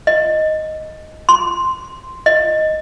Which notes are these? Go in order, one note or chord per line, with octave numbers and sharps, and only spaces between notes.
D#5
C6
D#5